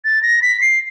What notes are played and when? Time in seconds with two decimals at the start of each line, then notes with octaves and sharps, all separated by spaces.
0.05 A6
0.23 A#6
0.42 B6
0.61 C7